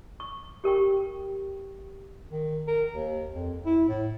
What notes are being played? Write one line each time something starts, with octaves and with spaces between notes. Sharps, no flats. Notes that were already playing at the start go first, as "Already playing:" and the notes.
C#6
G4 A#4 G5 C#6
D#3
A#4
D#2
F2
E4
A2